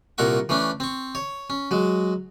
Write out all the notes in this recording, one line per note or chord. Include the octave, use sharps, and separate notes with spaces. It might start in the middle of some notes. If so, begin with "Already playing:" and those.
C2 A#2 A4 A#4 F#5 C#6
E3 A3 C#4 D4
C4 C#6
C#5
C#4
F#3 G#3